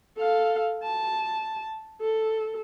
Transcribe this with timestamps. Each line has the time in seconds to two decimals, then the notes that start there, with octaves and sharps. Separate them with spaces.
0.18 A4 F5
0.83 A5
2.01 A4